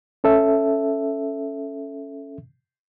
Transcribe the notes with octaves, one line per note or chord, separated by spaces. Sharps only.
C#4 A4 E5